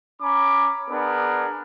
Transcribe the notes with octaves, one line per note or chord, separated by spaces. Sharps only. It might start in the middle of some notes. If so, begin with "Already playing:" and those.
C#4 A#5 B5 D6
B3 D4 G#4 A#4 B4